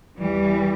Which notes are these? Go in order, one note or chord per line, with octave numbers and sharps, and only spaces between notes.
E2 E3 G3